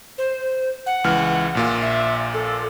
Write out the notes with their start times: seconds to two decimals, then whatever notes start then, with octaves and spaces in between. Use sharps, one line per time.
0.18 C5
0.86 F#5
1.04 C#2 E3 F6
1.55 A#1 A#2 F4
1.82 E5
2.34 A4